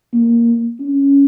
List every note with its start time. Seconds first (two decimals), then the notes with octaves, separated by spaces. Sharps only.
0.14 A#3
0.81 C#4